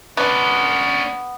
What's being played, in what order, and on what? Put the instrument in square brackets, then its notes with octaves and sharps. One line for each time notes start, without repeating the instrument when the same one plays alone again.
[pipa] B3 [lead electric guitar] C#4 D4